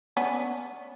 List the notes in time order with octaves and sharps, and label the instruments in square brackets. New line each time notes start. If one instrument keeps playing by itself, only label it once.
[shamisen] B3 C#4 D4